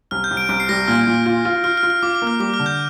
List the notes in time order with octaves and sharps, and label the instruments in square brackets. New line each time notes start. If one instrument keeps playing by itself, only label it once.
[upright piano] C2 [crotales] F6
[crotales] G6
[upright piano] C2
[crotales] D7
[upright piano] C2 [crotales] D7
[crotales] C7
[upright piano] G3 [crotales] A#6
[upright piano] A#2 [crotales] F6
[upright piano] A#2
F4
F4
[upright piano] F4 [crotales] F6
[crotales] F6
[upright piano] F4
[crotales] F6
[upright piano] F4 [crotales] D6
[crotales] D6
[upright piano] A#3
[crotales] F6
[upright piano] G3 [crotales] D6
[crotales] F6
[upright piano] D3
[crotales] G6